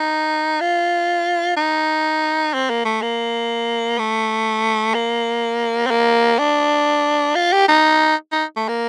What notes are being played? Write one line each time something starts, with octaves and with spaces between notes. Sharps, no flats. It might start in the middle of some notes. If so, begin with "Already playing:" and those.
Already playing: D#4
F4
D#4
C4
A#3
A3
A#3
A3
A#3
C4
A#3
D4
F4
G4
D#4
D#4
A3
A#3